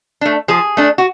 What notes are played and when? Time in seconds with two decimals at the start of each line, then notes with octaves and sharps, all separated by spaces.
0.21 A3 D4
0.48 F3 G#4
0.77 A3 D4
0.98 F#4